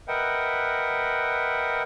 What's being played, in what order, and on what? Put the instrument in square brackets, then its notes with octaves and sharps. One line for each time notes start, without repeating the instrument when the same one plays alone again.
[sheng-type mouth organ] A#4 B4 D#5 E5 F#5 G5